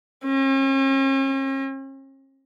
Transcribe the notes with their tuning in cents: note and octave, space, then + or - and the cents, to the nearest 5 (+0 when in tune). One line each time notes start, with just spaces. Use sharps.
C#4 -45